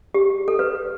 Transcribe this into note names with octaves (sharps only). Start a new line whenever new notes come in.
G4
A4
B4